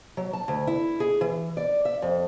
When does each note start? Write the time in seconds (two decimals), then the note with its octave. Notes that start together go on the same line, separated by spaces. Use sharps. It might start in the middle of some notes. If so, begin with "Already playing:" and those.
0.17 F#3
0.33 A5
0.48 D2
0.67 E4
1.00 G#4
1.21 E3
1.57 D5
1.85 E5
2.02 F2